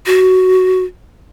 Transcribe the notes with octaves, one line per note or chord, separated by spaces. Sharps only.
F#4